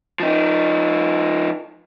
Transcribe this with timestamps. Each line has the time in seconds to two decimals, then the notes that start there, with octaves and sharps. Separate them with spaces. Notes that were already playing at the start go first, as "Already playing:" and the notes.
0.20 F3 D#4